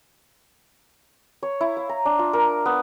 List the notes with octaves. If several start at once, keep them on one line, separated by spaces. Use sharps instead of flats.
C#5
E4
F5
A#5
D4
F4
A#4
B3